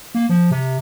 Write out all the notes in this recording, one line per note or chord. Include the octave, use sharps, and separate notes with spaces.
A#3
F3
C3